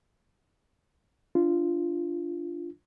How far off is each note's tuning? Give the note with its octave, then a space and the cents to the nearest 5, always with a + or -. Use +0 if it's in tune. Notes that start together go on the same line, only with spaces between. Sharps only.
D4 +0 F4 -15